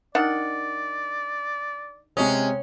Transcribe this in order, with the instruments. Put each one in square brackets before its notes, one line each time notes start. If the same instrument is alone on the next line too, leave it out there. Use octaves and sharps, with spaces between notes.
[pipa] D#3 D4 F#5 [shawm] D5
[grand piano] C3 G#3 D#6 [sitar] C#4